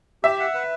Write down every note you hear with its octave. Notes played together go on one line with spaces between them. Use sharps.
G4 E5
F#5
B4